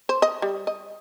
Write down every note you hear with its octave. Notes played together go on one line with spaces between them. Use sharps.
C5
D#5
G3
D#5